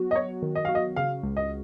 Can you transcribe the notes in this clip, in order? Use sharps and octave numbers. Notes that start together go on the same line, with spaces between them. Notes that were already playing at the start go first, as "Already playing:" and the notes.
Already playing: F#3 B3 F#4
D#5
F#3 C#5
D#3
D#5
F#4 F5
D#5
C#3 F5
C#2
D#5